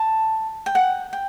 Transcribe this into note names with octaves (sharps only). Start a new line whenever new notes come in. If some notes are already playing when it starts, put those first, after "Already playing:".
Already playing: A5
G5
F#5
G5